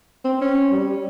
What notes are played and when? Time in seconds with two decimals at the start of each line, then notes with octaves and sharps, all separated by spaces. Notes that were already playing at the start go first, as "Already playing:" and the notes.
0.24 C4
0.41 C#4
0.71 G3